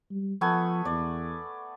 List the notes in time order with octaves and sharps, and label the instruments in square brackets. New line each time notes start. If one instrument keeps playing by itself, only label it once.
[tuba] G3
[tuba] F3 [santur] A3 B3 G#5
[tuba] E2 [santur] D5